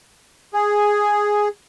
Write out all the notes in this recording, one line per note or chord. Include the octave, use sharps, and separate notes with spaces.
G#4